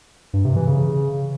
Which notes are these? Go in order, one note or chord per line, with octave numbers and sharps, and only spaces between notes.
G2
C3
E3
C#3